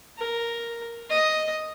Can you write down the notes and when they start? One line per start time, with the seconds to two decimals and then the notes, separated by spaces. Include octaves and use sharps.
0.18 A#4
1.10 D#5